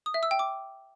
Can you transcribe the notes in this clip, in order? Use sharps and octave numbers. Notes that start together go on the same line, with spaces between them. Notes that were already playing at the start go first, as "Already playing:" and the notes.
D#6
E5
E6
G5
D6